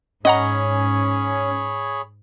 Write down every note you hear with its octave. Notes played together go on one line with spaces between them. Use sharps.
G#2 C#4 G#4 C#5 D#5 F#5 A#5 B5